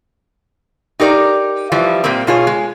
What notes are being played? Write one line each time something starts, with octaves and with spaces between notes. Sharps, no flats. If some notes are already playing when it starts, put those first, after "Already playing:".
D#4 G4 A#4 D5
E3 F3 G3
A#2 G3 A#3 C4
B2 F4 G#4 C#5
G#3